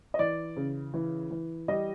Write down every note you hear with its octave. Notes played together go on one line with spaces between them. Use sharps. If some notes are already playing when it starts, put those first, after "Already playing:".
D#5
E3 D5
C#3
E3
E3
G3 D#5